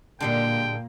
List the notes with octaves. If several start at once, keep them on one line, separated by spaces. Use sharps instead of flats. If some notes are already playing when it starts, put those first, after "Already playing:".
A#2 D3 G3 G#3 A#3 G5